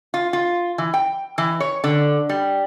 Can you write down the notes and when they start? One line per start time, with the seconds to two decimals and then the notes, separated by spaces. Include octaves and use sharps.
0.14 F4
0.33 F4
0.78 E3
0.94 G5
1.38 E3
1.60 C#5
1.84 D3
2.29 G3